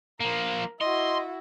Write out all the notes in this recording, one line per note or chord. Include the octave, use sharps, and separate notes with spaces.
F3 A#3 A#4
E4 F#4 D#5 C6